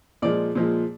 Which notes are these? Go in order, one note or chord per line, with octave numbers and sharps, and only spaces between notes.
A#2 F3 G#3 D5
A#2 F3 G#3